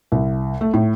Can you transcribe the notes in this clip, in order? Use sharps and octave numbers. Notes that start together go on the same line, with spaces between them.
C2
A3
A2